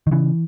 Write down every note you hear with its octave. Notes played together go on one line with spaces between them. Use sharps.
D#3
C#3 E3